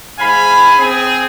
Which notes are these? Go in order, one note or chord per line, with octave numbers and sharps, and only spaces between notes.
G#2 F5 G#5 B5
C4 G#4